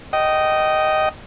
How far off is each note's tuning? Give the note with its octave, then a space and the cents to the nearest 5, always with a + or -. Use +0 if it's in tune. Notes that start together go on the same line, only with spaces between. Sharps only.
D#5 +0 G5 -25